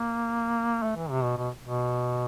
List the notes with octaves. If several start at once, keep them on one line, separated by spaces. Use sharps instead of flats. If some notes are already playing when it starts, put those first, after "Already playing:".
Already playing: A#3
A3
E3
C3
B2
B2
B2